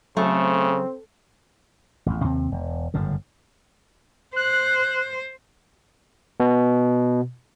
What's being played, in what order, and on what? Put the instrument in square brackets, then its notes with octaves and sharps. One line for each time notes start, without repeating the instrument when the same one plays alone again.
[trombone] C#3 [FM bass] F#3 [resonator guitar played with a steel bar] A3 [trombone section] C4
[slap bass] A1 E2
D#2 C3 C4
E1
G1 F#2 A2 C#3
[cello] C5 [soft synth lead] F#6
[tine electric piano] B2